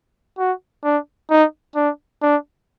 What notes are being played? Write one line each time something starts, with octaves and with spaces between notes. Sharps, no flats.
F#4
D4
D#4
D4
D4